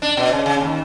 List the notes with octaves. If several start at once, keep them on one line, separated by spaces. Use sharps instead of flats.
D4
B2
C#3
C#3
D#2